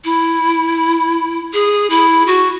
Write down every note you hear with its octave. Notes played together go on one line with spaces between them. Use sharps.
E4
G#4
E4
F#4